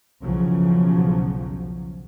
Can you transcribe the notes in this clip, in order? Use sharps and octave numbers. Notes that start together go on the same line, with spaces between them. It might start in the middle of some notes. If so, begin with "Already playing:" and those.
B1 E2 C#3 F3 F#3